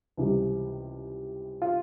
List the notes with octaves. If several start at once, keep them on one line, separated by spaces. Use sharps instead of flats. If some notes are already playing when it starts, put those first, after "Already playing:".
C#2 C3 E3 G3
F4